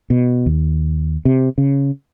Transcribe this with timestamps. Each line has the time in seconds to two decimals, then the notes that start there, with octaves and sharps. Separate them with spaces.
0.10 B2
0.46 D#2
1.25 C3
1.58 C#3